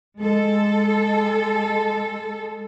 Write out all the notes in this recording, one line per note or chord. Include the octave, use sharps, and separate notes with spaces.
G#3 A4